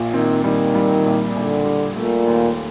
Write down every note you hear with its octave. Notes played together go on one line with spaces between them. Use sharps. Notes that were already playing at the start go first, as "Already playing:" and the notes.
Already playing: A#1 A#2
D#3 C4
D#3 G3
G3
A#1
A#1 D3
G3
A#2 A3
D#2